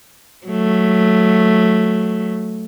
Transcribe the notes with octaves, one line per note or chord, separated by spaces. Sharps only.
F#3 A3